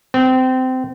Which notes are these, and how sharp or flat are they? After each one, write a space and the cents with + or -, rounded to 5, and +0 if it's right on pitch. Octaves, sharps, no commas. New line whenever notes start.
C4 -25